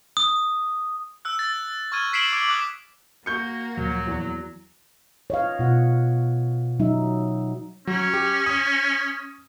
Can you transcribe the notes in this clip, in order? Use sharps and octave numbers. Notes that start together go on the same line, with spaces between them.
D#6
E6 F#6
A6
C#6 F6 G#6 D#7
G#6 B6 C7 D7 E7 F#7
D6 G#6 D7
D6 D#6 F#6 F#7
A#3 F#4 C#6 G6 C#7
D2 A#2 F3 F#3
E2
C#5 D#5 F5
B2 F4 F#5
F#3 D#4 E5
F#3 C#4
G4
D#6